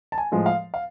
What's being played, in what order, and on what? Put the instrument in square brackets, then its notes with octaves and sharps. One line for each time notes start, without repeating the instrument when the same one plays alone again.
[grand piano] A5
G#5
A2 F3 G#3
F5
F5